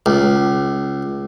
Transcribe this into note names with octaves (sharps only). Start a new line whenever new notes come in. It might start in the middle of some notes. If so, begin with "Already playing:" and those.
C#2